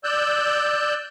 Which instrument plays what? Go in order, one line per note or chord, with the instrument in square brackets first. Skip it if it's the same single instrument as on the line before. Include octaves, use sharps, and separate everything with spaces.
[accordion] D5 E6 F#6 G6